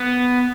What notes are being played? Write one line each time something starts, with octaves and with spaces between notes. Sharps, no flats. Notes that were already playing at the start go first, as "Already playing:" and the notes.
Already playing: B3